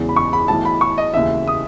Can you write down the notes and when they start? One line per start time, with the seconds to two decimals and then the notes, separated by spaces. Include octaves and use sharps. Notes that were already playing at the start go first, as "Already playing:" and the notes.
Already playing: E1 E2 C#3 E3
0.09 B5
0.16 C#6
0.33 B5
0.48 B1 A2 E3 A5
0.65 B5
0.81 C#6
0.98 D#5
1.14 E1 D#2 C#3 E3 E5
1.48 D#6